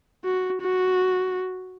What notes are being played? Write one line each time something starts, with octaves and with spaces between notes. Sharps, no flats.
F#4
F#4